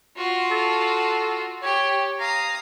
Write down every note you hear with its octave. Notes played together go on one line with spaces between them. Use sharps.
F4 F#4
A4
G4 C#5
F5 A#5 D#6